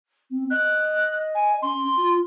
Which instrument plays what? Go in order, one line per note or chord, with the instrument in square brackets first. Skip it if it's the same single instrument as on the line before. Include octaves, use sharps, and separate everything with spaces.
[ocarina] C4
[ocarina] D#5 [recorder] F#6
[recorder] G#5
[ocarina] C#4 [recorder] C6
[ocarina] F4